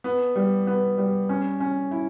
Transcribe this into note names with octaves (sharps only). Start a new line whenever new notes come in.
B3
G3
B3
G3
C#4
C#4
E4